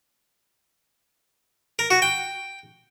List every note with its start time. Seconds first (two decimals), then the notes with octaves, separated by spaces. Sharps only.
1.79 A#4
1.91 F#4
2.02 G5